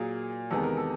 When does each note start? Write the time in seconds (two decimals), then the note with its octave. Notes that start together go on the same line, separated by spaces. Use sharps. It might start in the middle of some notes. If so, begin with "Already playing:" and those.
Already playing: A#2 F#3 A#3 G#4
0.50 E2 C3 D#3 G#3 B3 A4
0.63 A#4
0.77 A4